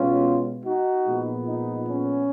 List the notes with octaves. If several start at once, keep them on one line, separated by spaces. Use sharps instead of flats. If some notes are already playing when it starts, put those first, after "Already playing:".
Already playing: B2 G#3 B3 C#4 F4
D#4 F#4
A#2 F3 G#3 B3
D#4
C#4